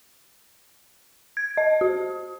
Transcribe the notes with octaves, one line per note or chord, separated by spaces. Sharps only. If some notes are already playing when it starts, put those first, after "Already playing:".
G#6
D#5
F#4